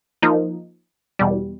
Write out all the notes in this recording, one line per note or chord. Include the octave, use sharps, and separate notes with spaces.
F3 A#3 D#4
E2 B2 G3